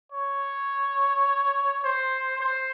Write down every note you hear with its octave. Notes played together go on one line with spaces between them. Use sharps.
C#5
C5
C5